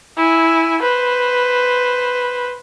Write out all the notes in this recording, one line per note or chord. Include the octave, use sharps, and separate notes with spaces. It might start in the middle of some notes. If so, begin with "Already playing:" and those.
E4 G#5
B4 C5